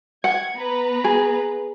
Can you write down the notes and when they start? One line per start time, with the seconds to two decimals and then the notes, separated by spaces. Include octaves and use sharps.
0.24 F#5 G#6
0.55 B3 B4 A#5
1.04 G#4